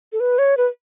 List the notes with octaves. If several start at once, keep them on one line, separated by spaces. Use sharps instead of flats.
A4
B4
C#5
B4